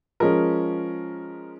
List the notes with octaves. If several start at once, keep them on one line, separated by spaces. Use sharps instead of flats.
F3 G#3 C#4 A#4